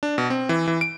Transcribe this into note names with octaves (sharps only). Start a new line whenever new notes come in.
D4
B2
C4
E3
E3
D7